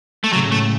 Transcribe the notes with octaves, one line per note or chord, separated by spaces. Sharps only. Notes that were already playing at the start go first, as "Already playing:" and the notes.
A3
A2 C#3 F#3
A3